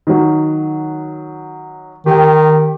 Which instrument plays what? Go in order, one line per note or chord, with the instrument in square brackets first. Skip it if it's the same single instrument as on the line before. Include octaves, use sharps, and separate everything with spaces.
[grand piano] D#3 F#3
[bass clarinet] D#3 [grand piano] G4 G5